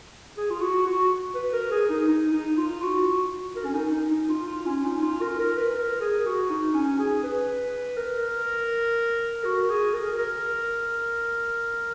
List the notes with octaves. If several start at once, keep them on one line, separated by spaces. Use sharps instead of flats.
G#4
F4
F#4
F#4
B4
A#4
G#4
D#4
D#4
D#4
F4
F#4
A#4
C#4
D#4
D#4
D#4
F4
F4
C#4
D#4
F4
A#4
A#4
B4
A#4
G#4
F#4
D#4
C#4
G#4
B4
A#4
F#4
G#4
A#4
A#4